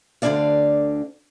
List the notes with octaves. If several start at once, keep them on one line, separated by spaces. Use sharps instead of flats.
D2 D3 D#3 D4 D5 F5